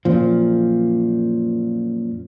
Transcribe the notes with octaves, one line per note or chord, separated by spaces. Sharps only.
F#2 A#2 F3